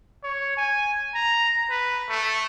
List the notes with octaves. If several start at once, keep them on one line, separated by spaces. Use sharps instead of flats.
C#5
G#5
A#5
B4
A3